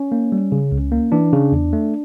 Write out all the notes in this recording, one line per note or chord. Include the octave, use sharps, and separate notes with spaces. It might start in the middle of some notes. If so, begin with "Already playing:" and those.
Already playing: C#4
A#3
G3
C#3
C#2
A#3
E3 D4
C#3
E2
A3